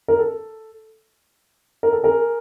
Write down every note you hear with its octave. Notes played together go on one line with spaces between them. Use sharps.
A#4
A4
A#4
A4
G#4 A#4